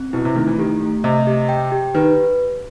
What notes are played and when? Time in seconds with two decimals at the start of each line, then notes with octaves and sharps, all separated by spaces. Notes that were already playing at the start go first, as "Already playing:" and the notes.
Already playing: C4
0.13 B2 E4
0.25 C3
0.35 D#3 A3
0.47 E3
0.59 D#3 G4
0.81 A3
1.04 C3 D#5
1.27 G4
1.49 G5
1.72 G4
1.95 D#3 B4